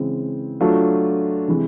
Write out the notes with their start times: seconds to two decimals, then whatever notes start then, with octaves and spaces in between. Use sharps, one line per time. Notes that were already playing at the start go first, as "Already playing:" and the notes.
Already playing: C#3 E3 G#3 C4
0.61 F#3 A3 D4 F4
1.48 C3 E3 G#3